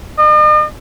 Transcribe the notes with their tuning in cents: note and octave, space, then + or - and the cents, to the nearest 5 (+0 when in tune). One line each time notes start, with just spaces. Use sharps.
D#5 -45